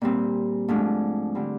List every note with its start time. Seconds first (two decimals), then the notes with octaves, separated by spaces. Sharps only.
0.02 A#2 G3 C4
0.68 G#2 F3 A3 D4
1.35 D3 G3 C4